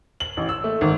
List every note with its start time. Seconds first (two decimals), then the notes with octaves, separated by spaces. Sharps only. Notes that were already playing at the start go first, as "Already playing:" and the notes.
0.20 F#7
0.37 A1
0.49 E6
0.64 A3
0.81 G#1